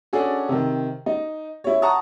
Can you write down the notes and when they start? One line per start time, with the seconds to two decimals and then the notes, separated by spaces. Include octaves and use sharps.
0.13 C#4 D4 F#4 G#4 A4
0.49 C3 D#3
1.06 D#4
1.64 E4 C#5
1.82 F#5 A5 A#5 C#6 D#6